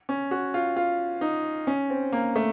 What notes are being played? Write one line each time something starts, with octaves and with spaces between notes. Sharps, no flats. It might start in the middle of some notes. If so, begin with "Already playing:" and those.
C#4
F#4
F4
F4
D#4
C#4
C4
A#3
A3